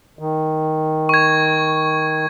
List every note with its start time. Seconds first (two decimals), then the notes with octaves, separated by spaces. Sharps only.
0.19 D#3
1.09 C#6 G#6